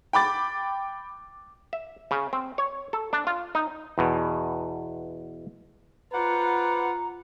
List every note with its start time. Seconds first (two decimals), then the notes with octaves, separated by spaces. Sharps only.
0.13 G5 B5 D6 A6
1.73 E5
2.11 C#3
2.33 C4
2.58 C#5
2.93 A4
3.13 D4
3.27 F4
3.55 D#4
3.98 E2 B2
6.13 F4 B4 C5 D5 F#5 A#5